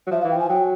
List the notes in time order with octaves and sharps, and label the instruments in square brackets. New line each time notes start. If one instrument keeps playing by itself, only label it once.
[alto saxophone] F#3
[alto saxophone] F3 [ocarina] E5
[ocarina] F5
[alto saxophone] E3
[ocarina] G5
[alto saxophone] F3 [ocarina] G#5
[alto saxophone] F#3 [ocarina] G5